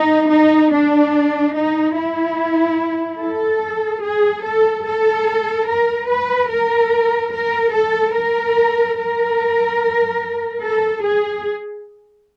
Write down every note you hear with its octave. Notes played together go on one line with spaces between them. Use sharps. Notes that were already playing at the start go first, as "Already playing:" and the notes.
Already playing: D#4
D#4
D4
D#4
E4
A4
G#4
A4
A4
A#4
B4
A#4
A#4
A4
A#4
A#4
A4
G#4